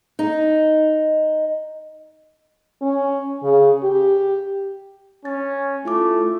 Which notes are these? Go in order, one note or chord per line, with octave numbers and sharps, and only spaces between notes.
D#4
C#4
C#3
G4
C#4 A6
A3 E4 F4 D6